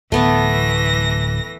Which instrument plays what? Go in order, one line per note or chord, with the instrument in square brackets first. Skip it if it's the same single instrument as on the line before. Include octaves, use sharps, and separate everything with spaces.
[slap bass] D1 [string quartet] E3 A#6 [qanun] A3 B3 A5